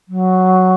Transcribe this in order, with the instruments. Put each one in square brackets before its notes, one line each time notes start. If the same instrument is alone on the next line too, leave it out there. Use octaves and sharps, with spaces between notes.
[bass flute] F#3